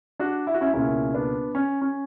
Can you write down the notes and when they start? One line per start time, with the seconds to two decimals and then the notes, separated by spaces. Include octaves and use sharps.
0.19 D4 F#4
0.47 E4
0.54 F#4
0.61 C#4 E4
0.74 C#2 B2 A#3 C#4 E4
1.14 B3 D4
1.55 C#4
1.82 C#4